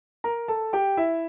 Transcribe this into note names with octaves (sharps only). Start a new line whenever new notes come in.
A#4 A#5
A4 A5
G4 G5
E4 E5